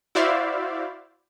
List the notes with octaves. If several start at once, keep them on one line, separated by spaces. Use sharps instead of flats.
E4 F#4 C5 D5 E5 F5